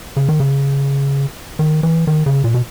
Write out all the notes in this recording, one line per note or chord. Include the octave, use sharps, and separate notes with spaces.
C#3
D#3
C#3
D#3
E3
D#3
C#3
A#2
B2